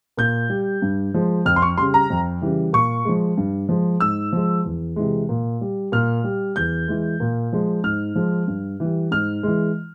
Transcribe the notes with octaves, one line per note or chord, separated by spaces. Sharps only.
A#2 G6
G3
G2
F3 G#3
F2 F6
C6
C#6
C#3 G3 C6
A#5
F2
C#3 E3 G3
A#2 C#6
F3 G#3
G2
F3 G#3
G#2 E6
F3 G#3
E2
C3 E3 G#3
A#2
G3
A#2 F6
G3
E2 G6
E3 G#3
A#2
F3 G#3
G#2 F6
F3 G#3
G2
E3 G3
G#2 F6
E3 G#3